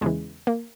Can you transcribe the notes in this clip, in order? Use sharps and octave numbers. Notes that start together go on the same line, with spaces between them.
E2 C#3 E3 G#3
A#3